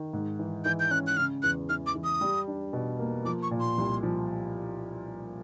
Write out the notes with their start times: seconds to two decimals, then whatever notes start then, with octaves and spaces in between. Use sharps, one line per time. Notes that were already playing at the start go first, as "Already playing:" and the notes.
Already playing: D#3
0.13 G#2
0.39 E3
0.65 E3 G6
0.80 G6
0.91 C#4 F#6
1.07 F#6
1.17 C#3 F6
1.43 E2 F#6
1.69 E3 F6
1.86 D6
1.95 E3
2.04 D#6
2.21 G3
2.47 D4
2.73 B2
2.99 A#3
3.25 F3 D6
3.43 C#6
3.51 A#2
3.60 C6
3.78 C2
4.03 F3